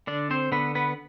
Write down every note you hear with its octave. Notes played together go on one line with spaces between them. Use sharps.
D3 D4 D5
C4 C5
D3 B3 B4
B3 B4